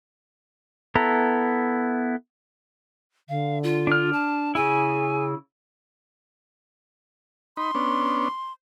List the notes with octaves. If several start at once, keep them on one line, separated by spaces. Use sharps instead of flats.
B3 E4 A4 A#5
D3 F5
F4
D4 F6
A5
C#3 E4 G#4 G#5
D#4 B5 C6
B3 C#4 D4